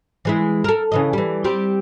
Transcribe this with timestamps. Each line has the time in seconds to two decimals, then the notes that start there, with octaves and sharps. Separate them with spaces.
0.25 E3 G#3 E4
0.64 A4 A#4
0.92 C#3 E3 D#5
1.13 E3 G3
1.44 G3 C4 G4